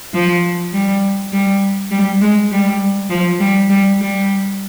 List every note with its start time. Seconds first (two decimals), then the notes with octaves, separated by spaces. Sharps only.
0.14 F3
0.73 G3
1.32 G3
1.91 G3
2.21 G#3
2.51 G3
3.10 F3
3.40 G3
3.70 G3
3.99 G3